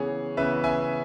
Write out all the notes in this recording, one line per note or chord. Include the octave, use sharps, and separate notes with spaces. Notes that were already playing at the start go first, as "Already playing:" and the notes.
Already playing: C#3 E3 B3 G#4 C#5
C#3 E3 B3 B4 E5
E5 G#5